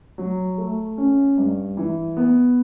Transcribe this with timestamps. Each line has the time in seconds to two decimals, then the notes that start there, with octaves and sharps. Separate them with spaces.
0.18 F#3
0.58 A3
0.98 C#4
1.37 G2
1.77 E3
2.17 B3